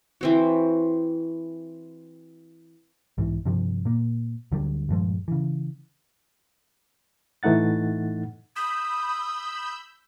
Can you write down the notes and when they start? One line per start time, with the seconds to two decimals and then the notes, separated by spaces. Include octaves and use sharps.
0.21 E3 C4 F#4
3.18 B1 G#2 E3
3.45 G2 C3 F3
3.85 A#2 A#3
4.52 D2 D3 F#3 G3
4.89 D#1 G2 F3 G#3
5.28 C#3 E3
7.43 A2 E3 A3 D#4 F#5 A6
8.56 B5 D#6 E6 G6